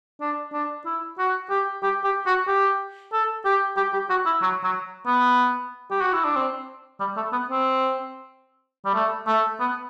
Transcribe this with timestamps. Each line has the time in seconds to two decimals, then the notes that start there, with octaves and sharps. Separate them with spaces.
0.21 D4
0.53 D4
0.85 E4
1.18 F#4
1.50 G4
1.83 G4
2.04 G4
2.26 F#4
2.47 G4
3.13 A4
3.45 G4
3.76 G4
3.93 G4
4.10 F#4
4.26 E4
4.41 F#3
4.63 F#3
5.06 B3
5.91 G4
6.01 F#4
6.13 E4
6.24 D4
6.36 C4
7.00 G3
7.16 A3
7.32 B3
7.49 C4
8.85 G3
8.94 A3
9.27 A3
9.60 B3